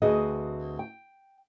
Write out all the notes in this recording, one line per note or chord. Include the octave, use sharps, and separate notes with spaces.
D2 C4 F#4 G#4 B4 D#5
G5